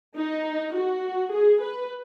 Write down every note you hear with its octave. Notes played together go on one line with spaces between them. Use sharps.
D#4
F#4
G#4
B4